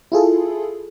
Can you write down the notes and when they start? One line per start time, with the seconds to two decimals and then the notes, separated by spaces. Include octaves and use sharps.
0.12 E4 F4 G#4 A4